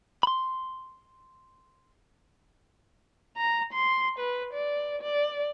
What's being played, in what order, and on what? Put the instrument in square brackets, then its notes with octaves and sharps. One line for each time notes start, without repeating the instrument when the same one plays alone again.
[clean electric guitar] B5 C6
[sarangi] A#5
C6
B4
D5
D5